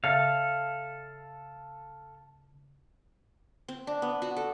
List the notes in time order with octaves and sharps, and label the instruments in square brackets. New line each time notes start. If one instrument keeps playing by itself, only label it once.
[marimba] C#3 E5 [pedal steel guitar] A4 F5
[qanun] C4
D4
B3
F#4
A4